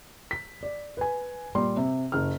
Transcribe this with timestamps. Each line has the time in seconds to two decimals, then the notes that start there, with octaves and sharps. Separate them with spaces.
0.31 B6
0.63 D5
0.97 B4 G#5
1.55 A#2 G3 C6
1.77 C3
2.12 F#1 F6